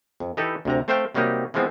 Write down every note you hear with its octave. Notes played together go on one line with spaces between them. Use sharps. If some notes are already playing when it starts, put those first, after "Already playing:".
F2
E3 D#4 G4 A4 B4
D2 C3 A#5
A3 C4 C5 E5 F5 G5
C3 F#3 G3 A#3 D#4 G4
E3 F3 G#3 B3 C4